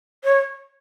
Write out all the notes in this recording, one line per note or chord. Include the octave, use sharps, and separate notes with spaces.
C#5